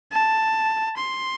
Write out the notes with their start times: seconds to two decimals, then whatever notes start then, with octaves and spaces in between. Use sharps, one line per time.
0.12 A5
0.97 C6